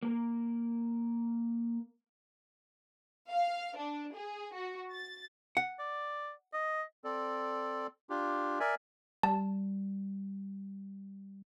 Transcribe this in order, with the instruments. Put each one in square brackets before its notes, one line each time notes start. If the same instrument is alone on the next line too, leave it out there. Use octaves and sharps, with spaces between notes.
[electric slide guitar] A#3 A#4
[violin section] F5
D4
G#4
F#4
A6
[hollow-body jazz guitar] F#5
[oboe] D5
D#5
[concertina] C4 A4 D5
D4 F4 G4
A#4 D5 E5 G#5
[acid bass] G3 [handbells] A5